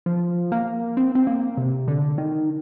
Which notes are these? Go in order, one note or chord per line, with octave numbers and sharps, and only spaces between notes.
F3
A#3
C4
C4
A#3
C3
D3
D#3